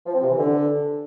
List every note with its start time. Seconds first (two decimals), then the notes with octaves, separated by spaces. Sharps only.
0.06 F3
0.14 C4
0.22 C3
0.31 E3
0.39 D3